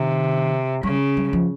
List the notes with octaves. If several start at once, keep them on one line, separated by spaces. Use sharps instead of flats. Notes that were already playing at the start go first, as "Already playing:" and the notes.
Already playing: C3 D#3
C#3 G3
G3
F3